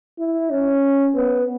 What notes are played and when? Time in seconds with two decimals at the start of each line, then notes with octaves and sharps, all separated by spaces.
0.19 E4
0.50 C#4
1.15 B3